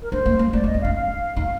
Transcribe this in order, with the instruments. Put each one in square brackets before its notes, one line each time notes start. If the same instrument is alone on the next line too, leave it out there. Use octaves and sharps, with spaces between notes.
[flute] A#4
[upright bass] D4 [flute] C5
[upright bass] A#3
A#3
[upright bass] A3 [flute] D5
[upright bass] A3
[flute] D#5
[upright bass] C4
[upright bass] D4 [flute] F5
[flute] F5
[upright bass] D#4